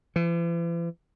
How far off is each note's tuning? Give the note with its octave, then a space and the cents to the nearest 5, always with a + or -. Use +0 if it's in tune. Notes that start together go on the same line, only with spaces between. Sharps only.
E3 +45